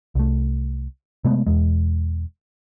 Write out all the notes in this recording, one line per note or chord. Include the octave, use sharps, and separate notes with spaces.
C2 A3
C3 G#3 A3 B3
E1 E2 G#3